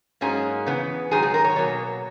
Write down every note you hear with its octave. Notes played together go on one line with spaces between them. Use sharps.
G#2 F#3 A#3 C#4 G#4
C#3 E3 B3
G#2 D#3 F#3 G#4
G#4
A#4
C#5
B2 F#3 A#3